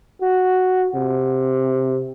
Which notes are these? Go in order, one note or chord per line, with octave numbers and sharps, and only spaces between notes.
F#4
C3